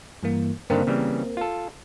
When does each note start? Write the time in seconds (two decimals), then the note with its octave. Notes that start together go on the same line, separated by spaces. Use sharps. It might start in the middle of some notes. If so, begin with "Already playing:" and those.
0.23 G2 E3 A#3
0.70 G2 D3 D#3 A#3 C4 A#4
0.87 C#3 E3 G3
1.37 F4 A4